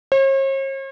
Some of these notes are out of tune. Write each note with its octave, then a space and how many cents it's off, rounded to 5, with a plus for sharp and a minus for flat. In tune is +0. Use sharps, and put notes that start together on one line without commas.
C#5 -45